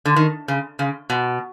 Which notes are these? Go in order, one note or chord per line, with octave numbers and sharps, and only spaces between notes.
D3
D#3
C#3
C#3
B2